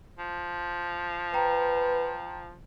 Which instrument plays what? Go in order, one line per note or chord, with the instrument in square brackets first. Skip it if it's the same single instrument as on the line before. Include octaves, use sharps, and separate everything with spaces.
[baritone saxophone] F3
[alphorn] B4 [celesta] G5 A#5